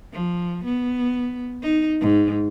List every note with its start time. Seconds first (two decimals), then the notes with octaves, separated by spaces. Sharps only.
0.13 F3
0.65 B3
1.62 D#4
2.01 G#2